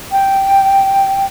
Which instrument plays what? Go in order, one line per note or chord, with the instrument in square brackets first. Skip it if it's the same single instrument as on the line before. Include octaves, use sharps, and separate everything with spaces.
[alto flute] G5